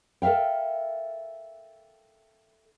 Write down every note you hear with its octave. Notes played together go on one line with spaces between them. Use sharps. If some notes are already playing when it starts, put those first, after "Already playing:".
A4 A#4 E5 F5 G5